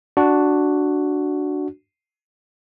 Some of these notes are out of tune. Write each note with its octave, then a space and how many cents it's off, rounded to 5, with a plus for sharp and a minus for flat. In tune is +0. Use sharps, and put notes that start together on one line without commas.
D4 +0 F#4 +0